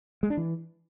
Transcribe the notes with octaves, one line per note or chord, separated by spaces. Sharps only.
G#3
D4
E3